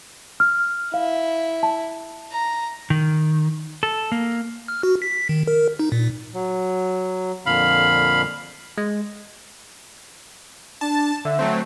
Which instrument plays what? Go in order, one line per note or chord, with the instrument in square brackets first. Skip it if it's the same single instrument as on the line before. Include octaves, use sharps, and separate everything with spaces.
[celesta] F6
[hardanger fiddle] E4 [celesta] F5
[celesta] A5
[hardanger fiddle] A#5
[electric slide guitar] D#3
A4
A#3
[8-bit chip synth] F6
F#4
B6
D#3
A#4
D#4
A#2
[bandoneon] F#3
[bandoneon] F2 A#2 D3 [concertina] F5 B5
[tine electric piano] G#3
[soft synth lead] D4 [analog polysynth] A5
[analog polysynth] D3 [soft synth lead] E5
[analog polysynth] F#3 A3 C4